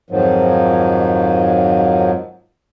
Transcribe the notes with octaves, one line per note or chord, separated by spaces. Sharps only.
F2 G#2 D#3 F3 F#3